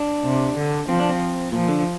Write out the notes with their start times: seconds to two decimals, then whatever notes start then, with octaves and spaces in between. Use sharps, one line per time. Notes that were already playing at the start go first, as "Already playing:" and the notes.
Already playing: D4
0.24 C3
0.56 D3
0.89 F3 C4
1.00 D4
1.09 C4
1.52 A#2 F3
1.68 D3